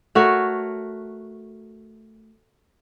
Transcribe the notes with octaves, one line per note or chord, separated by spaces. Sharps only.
A3 F#4 A#4 C#5